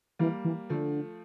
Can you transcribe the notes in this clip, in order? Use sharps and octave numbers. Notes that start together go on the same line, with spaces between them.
E3 G3 A#3
E3
D3 F3 A3